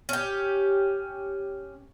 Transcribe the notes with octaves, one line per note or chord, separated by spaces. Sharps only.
C#4 G4